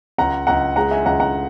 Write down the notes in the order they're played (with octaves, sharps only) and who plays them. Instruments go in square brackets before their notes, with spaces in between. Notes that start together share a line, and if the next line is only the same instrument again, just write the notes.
[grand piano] C#2 F#5 A#5
C#2 F#5 A#5
G#3 F#5 A#5
E5 G#5
C#2 F#5 A#5
F#5 A#5